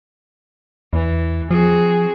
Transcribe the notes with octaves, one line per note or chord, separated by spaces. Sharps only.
E2 E3
F3 C4 F#4 G#4